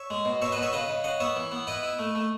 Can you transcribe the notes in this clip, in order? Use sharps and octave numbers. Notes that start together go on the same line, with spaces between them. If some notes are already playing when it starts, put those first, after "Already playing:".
Already playing: C#5 E5
G#3
B2
B2 C#5 E5
B4 D#5
B2
C#5 E5
C#3 B4 D#5
C#3
C#3 D#5 F#5
B3 C#5 E5
E3
B3
E4 B4 D#5
E4
A3
A3